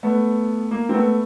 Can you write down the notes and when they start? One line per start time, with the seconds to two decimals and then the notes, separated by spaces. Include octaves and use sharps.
0.03 A3 B3
0.71 A#3
0.89 C4
0.93 A3 B3